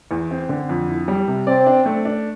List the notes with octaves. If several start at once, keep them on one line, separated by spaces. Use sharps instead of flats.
E2
C4
D3
F2
E4
G3
C3
C4 D5
D4
A3
D4